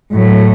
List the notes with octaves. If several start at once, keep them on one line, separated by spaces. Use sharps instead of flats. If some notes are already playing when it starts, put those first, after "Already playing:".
A2 F#3 A3